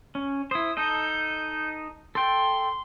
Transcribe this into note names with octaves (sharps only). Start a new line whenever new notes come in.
C#4
E4 C5 D#6
D#4 A4 D#5 G6
A4 G5 C6